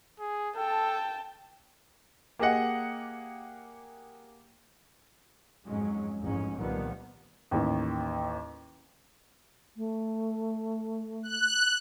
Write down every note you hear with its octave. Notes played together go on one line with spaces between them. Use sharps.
G#4
A4 G5 A5
A#3 G4 G#4 D#5 F#5
F2 G#2 F#3 G#3 C#4
A1 F2 G#2 G#3 C#4
C2 A#2 D#3 F3 G3 B3
A1 D#2
A3
F#6